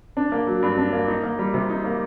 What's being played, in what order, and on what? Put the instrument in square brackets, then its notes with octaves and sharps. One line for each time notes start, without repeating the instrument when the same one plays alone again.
[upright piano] D4
A#3
F#3
G2
D4
A#3
D#4
A#3
G3
C3
D#4
A#3